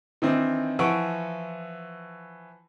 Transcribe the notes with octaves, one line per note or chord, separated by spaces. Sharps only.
D#3 E3 C4 D4 D#4
E3 F3 F#5 C#6 D7